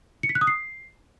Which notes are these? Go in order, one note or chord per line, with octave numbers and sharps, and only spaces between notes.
C#7
B6
F#6
D#6
C7